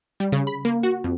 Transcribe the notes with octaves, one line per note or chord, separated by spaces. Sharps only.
G3
C#3
B5
A#3
F#4
F2